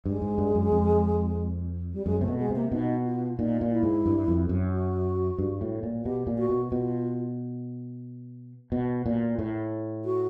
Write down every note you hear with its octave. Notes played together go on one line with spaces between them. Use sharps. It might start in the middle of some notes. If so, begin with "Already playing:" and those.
G2 G#3
G#2
G2
F#2
F2
G3
F#2 G#3
C3 A3
B2
G#3
C3
A#3
B2 D#4
F4
A#2 D#4
A#2
E4
G#2
G2
F2
F#2
F#4
G2
A2
A#2
B2 G4
A#2
F#4
B2
B2 F4
B2
A#2
A2
F#4